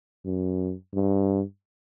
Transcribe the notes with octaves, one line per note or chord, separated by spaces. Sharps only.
F#2
G2